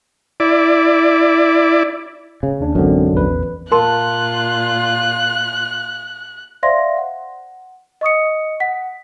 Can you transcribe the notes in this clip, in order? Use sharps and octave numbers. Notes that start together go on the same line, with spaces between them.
E4 D5
C#3
D#2 D4
A1 F#2 D3 G#3 C4
A#1 E2 B4
A#2 F4 A#4 A5 C6 F#6
C5 D5 E5 F5 C6 A#6
F#5
D#5 C#6 D#6 C#7
F#5 B6